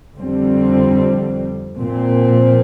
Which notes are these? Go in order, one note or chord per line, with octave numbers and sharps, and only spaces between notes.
F2 D3 G3 C4
A#2 F3 C4